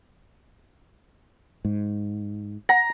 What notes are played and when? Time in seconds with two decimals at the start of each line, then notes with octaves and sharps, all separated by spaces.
1.65 G#2
2.69 F#5 A#5